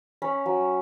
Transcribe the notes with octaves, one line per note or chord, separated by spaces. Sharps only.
C#4 B5
F#3